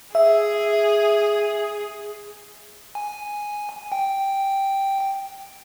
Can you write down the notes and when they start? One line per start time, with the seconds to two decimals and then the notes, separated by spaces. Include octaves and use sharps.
0.15 G#4 E5
2.95 G#5
3.92 G5